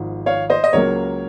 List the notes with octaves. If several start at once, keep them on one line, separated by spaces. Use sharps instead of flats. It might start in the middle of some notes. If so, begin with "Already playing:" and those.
Already playing: G#1 G#2 F3
C#5 F5
C5 D#5
D#5
C#2 C#3 F#3 A#3 A#4 C#5